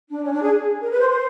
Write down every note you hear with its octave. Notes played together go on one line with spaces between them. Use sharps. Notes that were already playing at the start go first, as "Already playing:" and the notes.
D4
C#4
D4
G#4
A#4
B4
C5
C5